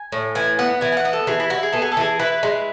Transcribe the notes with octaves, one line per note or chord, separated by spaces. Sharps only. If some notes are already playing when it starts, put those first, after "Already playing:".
Already playing: G#5
A2
E3 G#5
B3 F#5
E3 G#5
G#5
F#5
B3
A4
E3 G#4
E4
E4 F#4
G#4
B3 A4
G#4
A4
E3 G#4
E4 B4
G#3